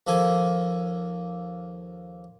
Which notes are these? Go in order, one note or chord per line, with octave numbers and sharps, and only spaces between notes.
D#2 F3 A#3 A4 G#5